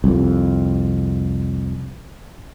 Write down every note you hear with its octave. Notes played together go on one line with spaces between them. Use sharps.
C2 F2